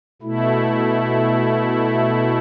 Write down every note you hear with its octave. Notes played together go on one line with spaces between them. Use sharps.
B2 A3 E4